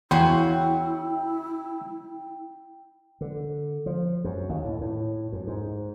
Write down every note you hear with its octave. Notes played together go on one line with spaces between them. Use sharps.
E2 C#3 E4 F#4 G5 C6
D3
F3
F#2
D#2
A2
A2
F#2
G#2